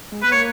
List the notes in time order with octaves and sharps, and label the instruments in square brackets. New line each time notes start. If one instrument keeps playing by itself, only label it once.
[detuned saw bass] G#3
[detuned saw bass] B3 [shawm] B4
[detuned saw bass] A#3 [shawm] C#5